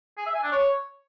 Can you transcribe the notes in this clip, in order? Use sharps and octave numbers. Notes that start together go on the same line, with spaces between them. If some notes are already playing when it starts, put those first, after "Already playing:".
G#4
E5
G#5
D4
C#5